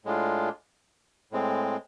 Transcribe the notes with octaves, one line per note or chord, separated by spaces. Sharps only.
A2 G#3 D4 F4
A2 G#3 C4